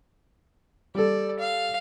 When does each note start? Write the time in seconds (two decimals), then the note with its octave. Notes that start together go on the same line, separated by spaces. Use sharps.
0.95 G3 A4 D5
1.39 F5